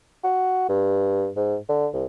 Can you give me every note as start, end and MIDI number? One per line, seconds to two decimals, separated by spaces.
0.24 0.65 66
0.69 1.28 43
1.37 1.56 44
1.69 1.88 50
1.93 2.05 36